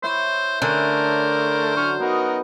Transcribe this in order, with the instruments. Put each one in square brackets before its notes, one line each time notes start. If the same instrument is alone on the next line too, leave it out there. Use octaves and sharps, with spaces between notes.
[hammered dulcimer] E4 C#5 [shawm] C5
[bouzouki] D3 [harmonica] A3 A#4 [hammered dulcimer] C#4 E5 C#6 [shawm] C5
[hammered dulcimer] F#3 [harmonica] C#6 F6
[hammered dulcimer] B3 [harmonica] D#4 F#4 A#4